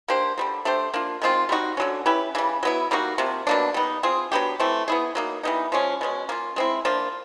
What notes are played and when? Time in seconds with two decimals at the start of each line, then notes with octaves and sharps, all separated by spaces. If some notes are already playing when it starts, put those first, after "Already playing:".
0.08 A#3 D4 G4 C5
0.38 D3 G3 A#3
0.65 A3 D4 G4 C5
0.94 A#3 D4 F4
1.22 D#3 G#3 C4 F4
1.49 G3 C4 D#4 F#4
1.77 D3 F#3 A#3 C#4
2.06 C#4 E4 G4 B4
2.35 C#3 E3 G3
2.63 F#3 B3 E4
2.91 G3 A#3 D#4 F#4
3.18 C3 F3 A#3
3.47 B2 F#3 A#3 D4
3.74 G3 B3 D#4
4.03 C4 F4 G#4
4.32 F#3 B3 D4 G4
4.60 E3 A3 C4
4.88 B3 E4 G#4
5.15 F#3 A#3 D#4
5.43 E3 G3 B3 D#4
5.72 F3 G#3 C#4
6.01 B2 G#3 C#4
6.29 A#3 C#4 F4
6.56 G#3 C4 E4
6.85 F3 A#3 D4 F4